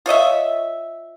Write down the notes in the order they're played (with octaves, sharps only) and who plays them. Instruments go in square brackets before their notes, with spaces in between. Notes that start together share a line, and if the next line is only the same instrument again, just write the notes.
[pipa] F4 C#5 D#5 E5